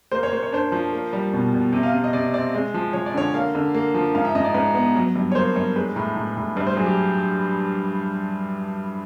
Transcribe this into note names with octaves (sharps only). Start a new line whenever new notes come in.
A#3 C5
C#5
A#3 C5
C#5
D4 C5
F3
A#3
G3
B2
B2
C3
F5
C3
D#5
C3 D5
C4 D5
G#3
F3
F3 C#5
D5
D3 C#5
A#3 F5
D3
A#3
F3
G#2 F5
E5
G#2 D#5
D5
G#2 B4
B3
F#3
G2
C#5
A#3 C5
G2 C#5
G#3 B4
A2
A2
A2
G2 B4
C5
F#3 G#4
G4